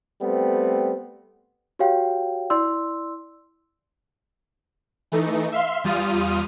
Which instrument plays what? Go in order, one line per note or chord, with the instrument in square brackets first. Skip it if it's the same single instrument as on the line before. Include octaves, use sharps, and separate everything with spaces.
[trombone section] G3 A3 B3 C4
[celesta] F#4 G4 C#5 F5 G5
E4 D5 C6 E6
[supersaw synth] E3 A3 D#4
E5 F5 C6
E2 G3 F4 D#6 F6 D#7